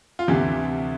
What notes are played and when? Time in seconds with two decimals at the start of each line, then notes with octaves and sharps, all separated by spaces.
0.19 F4
0.27 D2 C3 E3 G4